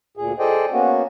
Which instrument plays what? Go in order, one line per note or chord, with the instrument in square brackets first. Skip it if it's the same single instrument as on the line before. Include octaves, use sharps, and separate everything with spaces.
[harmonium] D2 A#2 G#4
G#4 A4 C5 D5 D#5 G5
A#3 B3 C#4 F#4